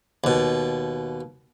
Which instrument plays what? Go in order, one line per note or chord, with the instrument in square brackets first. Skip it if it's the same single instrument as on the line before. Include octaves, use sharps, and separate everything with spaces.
[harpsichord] D#2 B2